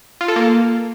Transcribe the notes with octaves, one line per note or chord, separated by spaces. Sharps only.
F4
A4
A#3